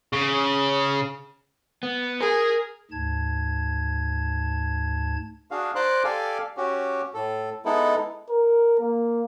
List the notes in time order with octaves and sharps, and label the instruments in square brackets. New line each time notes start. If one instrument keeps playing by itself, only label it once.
[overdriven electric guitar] C#3
B3
[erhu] G#4 [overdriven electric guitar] A#4
[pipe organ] D2 G#2 A5 G#6
[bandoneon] D4 F#4 G#4 F5
C5 D5 A#5 C6 D6 F#6
G4 A4 D5 F5 G#5
C#4 F#4 G4
A2 A4
G#3 B3 D#4 E4 A4
[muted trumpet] A#4
A#3